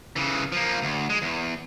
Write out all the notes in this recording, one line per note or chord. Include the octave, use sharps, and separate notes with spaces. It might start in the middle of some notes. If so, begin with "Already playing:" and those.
C#3 E3
F3 A#3
D2
G#3
E2